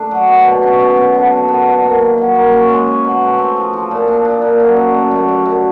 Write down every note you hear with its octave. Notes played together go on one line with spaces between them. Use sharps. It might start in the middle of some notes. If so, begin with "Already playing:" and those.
Already playing: A3 D4
F#3
B3
B2
C#4
B2
B2
D3
D3
B3
D3
A#3
D#3
F#3
A#3
C#4
G#3
C#4
B2
A3
C4
F3
F3
A#2
D4
D4
A#3
F#2
F#2
A3
F#2
G3
F#2